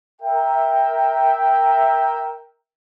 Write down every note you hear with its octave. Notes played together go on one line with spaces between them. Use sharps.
A#4 E5 G5